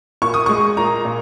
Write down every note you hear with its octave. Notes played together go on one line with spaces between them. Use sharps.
A#2 C#6
D#6
G#3 C#6
A#2 A#5
A#2